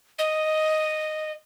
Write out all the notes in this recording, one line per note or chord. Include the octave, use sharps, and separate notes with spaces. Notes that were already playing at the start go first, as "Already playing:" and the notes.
D#5